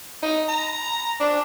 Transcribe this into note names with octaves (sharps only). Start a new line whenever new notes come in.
D#4
A#5
D4